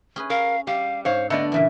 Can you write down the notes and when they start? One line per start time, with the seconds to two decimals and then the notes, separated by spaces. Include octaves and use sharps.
0.16 C#4 G#4 B4
0.30 A#4 F5
0.67 G3 G4 F5
1.05 G#2 C5 C#5 F5
1.30 D3 A3 B3 D5 D#5
1.52 A#2 C#3 E3 E5